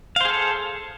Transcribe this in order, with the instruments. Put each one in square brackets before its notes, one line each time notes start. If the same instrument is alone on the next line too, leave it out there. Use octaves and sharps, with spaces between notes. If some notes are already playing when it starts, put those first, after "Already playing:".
[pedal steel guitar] F5
C5
G#4
A4